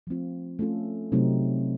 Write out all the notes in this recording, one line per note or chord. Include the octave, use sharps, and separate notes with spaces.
F3 A3 C4 F4
A3 C#4 F4 A4
C3 F#3 A3 C4 D#4